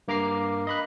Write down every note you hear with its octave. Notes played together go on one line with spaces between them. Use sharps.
G2 A#3 A#5 D6 C7
D#5 B5 F#6